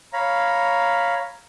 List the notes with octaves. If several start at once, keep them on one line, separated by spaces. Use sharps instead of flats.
C#5 F5 A#5 B5